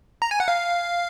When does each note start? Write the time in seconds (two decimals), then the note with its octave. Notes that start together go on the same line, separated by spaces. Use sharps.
0.22 A#5
0.31 G#5
0.40 F#5
0.48 F5